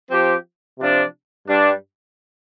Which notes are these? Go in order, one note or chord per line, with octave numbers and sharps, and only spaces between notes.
F3 C4 G4
C3 F3 D4
G2 G3 D4